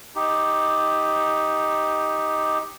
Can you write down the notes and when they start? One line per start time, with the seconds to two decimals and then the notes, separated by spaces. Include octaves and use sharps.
0.15 D#4 G4